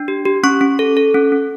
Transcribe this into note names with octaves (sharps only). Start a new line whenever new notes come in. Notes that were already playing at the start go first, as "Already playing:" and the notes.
Already playing: D4
G4
G4
C#4 C#6
C#4
A4
A4
C#4
C#4